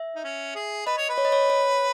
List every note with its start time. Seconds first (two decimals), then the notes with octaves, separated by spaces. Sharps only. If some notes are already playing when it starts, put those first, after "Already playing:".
Already playing: E5
0.15 D#4
0.24 C#4
0.55 G#4
0.86 B4 D#5
0.98 C#5
1.09 B4
1.18 C#5
1.25 D#5
1.32 C#5
1.50 C#5